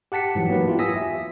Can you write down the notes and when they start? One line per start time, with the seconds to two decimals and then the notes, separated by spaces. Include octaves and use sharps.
0.12 G4 F#5 A5 B6 C#7
0.35 G#2 E3 F#3
0.49 F#3 A#3 B3 D#4 B4
0.68 E4 F4 G4
0.79 G#5 D#6 E6 A#6 B6
0.96 E5